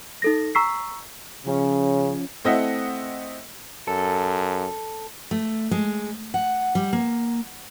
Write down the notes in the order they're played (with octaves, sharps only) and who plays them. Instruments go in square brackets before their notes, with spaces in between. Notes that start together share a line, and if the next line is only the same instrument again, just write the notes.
[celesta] D#4 A4 A#6
A#5 C#6 E6 B6 C7
[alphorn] C#3 [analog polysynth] F3 C#4
[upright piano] A3 C4 E4 D#5 E5 F#5
[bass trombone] F#2 [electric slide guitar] A4
[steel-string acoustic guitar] A3
G#3
F#5
G3
A#3